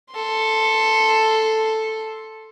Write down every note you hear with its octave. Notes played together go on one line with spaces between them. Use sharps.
A4 C6